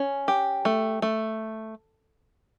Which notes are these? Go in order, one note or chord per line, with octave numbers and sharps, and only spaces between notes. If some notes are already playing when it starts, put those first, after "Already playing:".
Already playing: C#4
G4
A3
A3